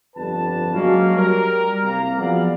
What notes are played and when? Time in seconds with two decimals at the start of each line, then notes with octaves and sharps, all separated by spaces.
0.16 G1 F2 G3 B4 A5
0.74 F#3 G#3 A#3 C#4
1.16 G3 A#4
1.83 C2 A#3 A#5
2.18 F3 F#3 B3 G#4 D5 F5